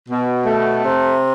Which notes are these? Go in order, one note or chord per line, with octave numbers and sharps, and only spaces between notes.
B2
A3
C3